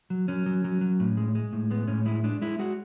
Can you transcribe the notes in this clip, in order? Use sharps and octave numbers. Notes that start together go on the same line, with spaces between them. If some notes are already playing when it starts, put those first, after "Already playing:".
F#3
F#3 C#4
F#3
F#3
F#3
A2
G#3
G#3
A2
G#3 B3
A2 C#4
G#3 E4
G#3 D4
G#3 E4
G#3 F#4